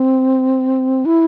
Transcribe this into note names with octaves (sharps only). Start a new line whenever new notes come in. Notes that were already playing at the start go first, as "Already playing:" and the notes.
Already playing: C4
E4